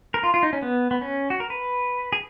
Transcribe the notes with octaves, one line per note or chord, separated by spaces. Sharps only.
A#4
F4
F4
D#4
C#4
B3
B3
C#4
F#4
A#4
B4
G#4